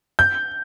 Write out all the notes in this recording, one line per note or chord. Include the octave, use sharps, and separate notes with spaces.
G6